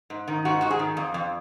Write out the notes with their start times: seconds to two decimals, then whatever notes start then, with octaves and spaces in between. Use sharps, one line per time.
0.10 G#2
0.28 D#3
0.45 G#2 F#4
0.61 G#2 F#4
0.70 G#4
0.79 D#3
0.97 F2
1.14 F2